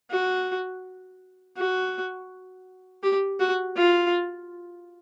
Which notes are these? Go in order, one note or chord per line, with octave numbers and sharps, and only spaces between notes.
F#4
F#4
G4
F#4
F4